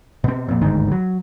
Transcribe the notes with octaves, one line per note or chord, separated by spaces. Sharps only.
B2 C4
F2 A#2
G1 D2 G#2 D#3
F#3